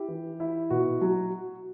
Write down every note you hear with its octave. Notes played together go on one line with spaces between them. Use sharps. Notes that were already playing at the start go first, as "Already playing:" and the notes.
Already playing: E4 G4
E3
E4
B2 F#4
F#3